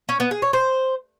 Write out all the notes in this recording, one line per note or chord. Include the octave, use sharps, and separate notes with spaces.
C#4
B3
G#4
C#5
C5